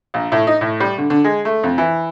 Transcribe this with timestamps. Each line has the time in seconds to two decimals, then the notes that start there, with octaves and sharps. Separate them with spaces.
0.14 A#1
0.32 A2
0.47 D#4
0.61 A2
0.80 G3
0.98 D3
1.10 D3
1.24 G#3
1.45 A3
1.63 F2
1.78 E3